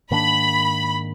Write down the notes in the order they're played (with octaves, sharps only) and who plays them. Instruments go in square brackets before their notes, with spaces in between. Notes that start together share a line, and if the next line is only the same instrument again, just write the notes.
[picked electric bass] G#2 D#3 A#3 D4 [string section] B5